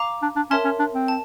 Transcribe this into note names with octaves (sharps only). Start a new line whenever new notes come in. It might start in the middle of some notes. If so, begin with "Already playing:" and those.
Already playing: F5 A#5 D6
D4
D4
C#4 A#4 C#5 E5 A5 C6
C#4
D4
C4
A5